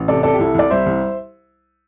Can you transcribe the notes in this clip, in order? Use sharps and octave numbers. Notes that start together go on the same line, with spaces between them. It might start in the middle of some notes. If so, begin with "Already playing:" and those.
Already playing: A1
C3 A4 D5
C3 A4 D5
G4
C2 E4 A4
C2 D5
G3 C5 E5
C2